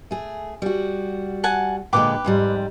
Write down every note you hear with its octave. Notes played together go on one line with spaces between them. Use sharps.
A3 G#4
G3 F#4
F#5 G#5 A5
A#2 D3 G#3 G4 B4 D6
F2 G#2 G3